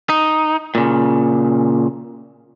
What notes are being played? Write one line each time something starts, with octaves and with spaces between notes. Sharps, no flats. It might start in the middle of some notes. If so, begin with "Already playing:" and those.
D#4
A#2 C#3